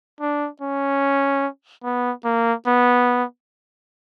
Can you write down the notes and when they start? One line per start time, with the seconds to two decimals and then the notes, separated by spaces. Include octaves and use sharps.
0.21 D4
0.61 C#4
1.84 B3
2.25 A#3
2.67 B3